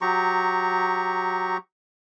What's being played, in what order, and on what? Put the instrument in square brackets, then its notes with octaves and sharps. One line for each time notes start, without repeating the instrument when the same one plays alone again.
[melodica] F#3 G4 A#5 C#6